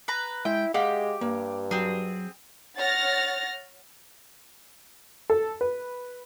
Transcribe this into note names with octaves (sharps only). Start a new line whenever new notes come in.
B4 A#5
G#3 E4 G5
G#3 G4 F5 F#5
G2 A#3
F#3 C4 G#4
C#5 F#5 F6 A6 A#6
A4
B4